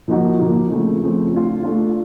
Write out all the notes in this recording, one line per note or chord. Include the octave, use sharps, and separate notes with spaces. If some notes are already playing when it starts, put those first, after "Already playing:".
A#2 F3 A#3 D#4 F#4
A#2 F3 A#3 D#4 F#4
C#3 F3 A3 C4
C#3 F3 A3 C4
A3 D4 F4
A3 D4 F4